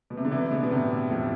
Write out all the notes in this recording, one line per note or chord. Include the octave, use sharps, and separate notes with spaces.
B2
C3
D3
C3 E3
B2 D3
B2
A2 C3
F2 A2